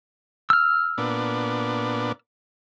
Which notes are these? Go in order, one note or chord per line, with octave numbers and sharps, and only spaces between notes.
E6 F6
A#2 B3 D4